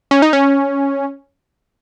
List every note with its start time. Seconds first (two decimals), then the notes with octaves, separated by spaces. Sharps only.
0.11 C#4
0.22 D#4
0.33 C#4